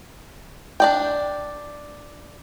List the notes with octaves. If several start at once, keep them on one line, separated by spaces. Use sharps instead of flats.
D4 D5 G5